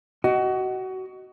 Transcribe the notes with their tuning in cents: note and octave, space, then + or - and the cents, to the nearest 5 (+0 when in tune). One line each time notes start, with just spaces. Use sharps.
F#4 +25 D#5 +0